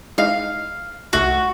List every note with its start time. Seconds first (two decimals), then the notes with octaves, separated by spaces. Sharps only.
0.18 G#3 D#4 E4 F5
1.13 C2 A3 F#4 F#6